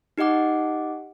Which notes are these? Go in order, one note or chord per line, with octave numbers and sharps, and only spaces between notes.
D#4 G4 D#5 F#5 D6